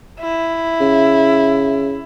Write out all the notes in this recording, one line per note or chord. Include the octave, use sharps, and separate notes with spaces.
E4
C#3